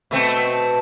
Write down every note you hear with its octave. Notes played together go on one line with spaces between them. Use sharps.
B2 A3 C4